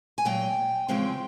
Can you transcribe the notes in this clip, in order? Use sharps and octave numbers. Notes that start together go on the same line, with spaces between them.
G#5
A#2 F#3 A#3 G5
E2 C#3 F3 G#3 C4 G5